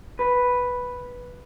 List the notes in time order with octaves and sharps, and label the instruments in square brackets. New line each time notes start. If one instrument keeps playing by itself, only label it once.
[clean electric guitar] B4